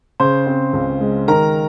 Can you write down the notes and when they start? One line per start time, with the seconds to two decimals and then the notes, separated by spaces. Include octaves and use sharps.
0.20 C#3 C5 C6
0.47 C4
0.73 C#2
1.01 G#3
1.28 D#3 A#4 A#5